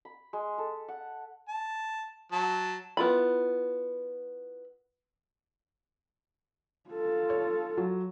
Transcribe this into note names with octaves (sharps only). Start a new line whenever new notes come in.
B5
G#3
A4
F#5
A5
F#3 A5
B3 E4 F4 B5
F4 A4
C#5
F#3